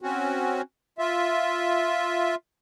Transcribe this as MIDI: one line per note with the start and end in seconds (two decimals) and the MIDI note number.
0.02 0.62 60
0.02 0.62 61
0.02 0.62 66
0.99 2.35 65
0.99 2.35 76